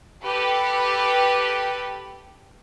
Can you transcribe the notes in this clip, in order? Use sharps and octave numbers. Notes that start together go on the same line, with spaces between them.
G4 A4 B4